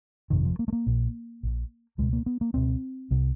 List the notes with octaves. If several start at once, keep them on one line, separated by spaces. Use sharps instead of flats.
G1 F2 C3 D#3
F3
A#3
A3
A#3
A#1 A#2
A#1 A#2
C#2 B2 G#3
A#3
B3
A#3
C#2 B2 C4
C2 C3